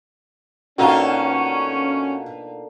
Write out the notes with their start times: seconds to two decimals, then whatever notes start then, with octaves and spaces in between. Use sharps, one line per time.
0.78 B2 D3 A#3 C#4 D#4 F4 F#4 A5